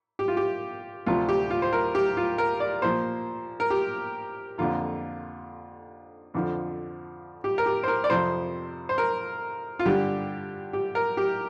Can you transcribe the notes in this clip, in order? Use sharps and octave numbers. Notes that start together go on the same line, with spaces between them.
G4
F4
G4
D2 C3 F3 F4
G4
F4
C5
A#4
G4
F4
A#4
D5
A#2 F3 A#3 C5
A#4
G4
F2 D3 A#3 F4
F2 D3 F3
G4
A#4
G4
C5
A#4
D5
F2 C3 F3 C5
C5
A#4
F4
G2 D3 G3 G4
G4
A#4
G4